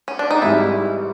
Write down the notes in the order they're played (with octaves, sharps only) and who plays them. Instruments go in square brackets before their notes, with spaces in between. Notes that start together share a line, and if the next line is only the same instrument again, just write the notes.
[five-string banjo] C#4
D4
D#4
[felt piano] G#1 G#2 E3 G3 [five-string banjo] E4